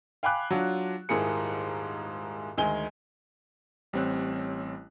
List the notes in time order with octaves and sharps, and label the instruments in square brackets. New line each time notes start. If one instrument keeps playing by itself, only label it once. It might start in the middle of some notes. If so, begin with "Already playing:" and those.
[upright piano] F5 G5 G#5 B5 D6 F#6
F#3 D4 F4
D#1 G#2 E4 G#4 A#4 C#7
D2 D#3 G#3 G#5 G7
[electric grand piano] A1 G3 C4 C#5 F#6